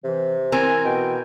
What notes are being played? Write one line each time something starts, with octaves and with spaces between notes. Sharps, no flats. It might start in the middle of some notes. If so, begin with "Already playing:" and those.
C3 E3
E3 C4 A#4 G#5
B2 G5